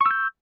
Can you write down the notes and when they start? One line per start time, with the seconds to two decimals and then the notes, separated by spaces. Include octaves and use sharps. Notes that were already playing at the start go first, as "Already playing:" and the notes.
0.01 C#6
0.06 E6
0.11 G6